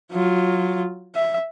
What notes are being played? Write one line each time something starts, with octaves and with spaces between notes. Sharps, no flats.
F#3 F4
E5